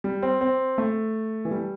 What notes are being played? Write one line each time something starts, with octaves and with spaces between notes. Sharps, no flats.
G3
C4
C4
A3
E3
G3